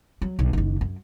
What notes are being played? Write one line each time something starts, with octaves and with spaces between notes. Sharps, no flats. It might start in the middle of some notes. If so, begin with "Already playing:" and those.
F#3
B1
F#1 D#3
F#2